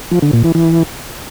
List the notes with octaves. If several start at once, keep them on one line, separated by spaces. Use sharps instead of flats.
F3
D3
A#2
E3
E3